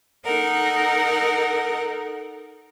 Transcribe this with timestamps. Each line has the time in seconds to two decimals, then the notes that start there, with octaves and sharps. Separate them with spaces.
0.25 D#4 A4 A#4 F#5